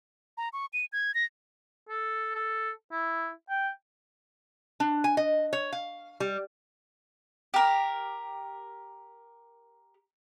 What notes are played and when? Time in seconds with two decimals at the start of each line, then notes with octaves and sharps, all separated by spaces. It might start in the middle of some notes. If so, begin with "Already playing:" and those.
0.37 A#5
0.53 C#6
0.73 D#7
0.92 G#6
1.14 A#6
1.89 A4
2.35 A4
2.91 E4
3.49 G5
4.80 D4
5.04 G#5
5.17 D#5
5.53 C#5
5.72 F5
6.20 G3
7.54 G4 A#4